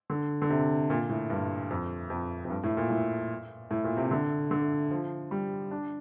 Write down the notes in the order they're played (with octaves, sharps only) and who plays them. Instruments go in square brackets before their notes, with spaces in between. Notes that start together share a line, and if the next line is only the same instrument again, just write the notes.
[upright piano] D3
D3
C3
A#2
A2
G2
F2
F2
F2
G2
A2
A#2
A2
A2
A#2
C3
D3
D3
F3
G3
D4